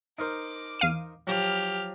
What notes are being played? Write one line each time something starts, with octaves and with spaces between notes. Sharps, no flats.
D#4 A#4 C5 D6
E2 F5 D#7
F3 F#3 G4 F6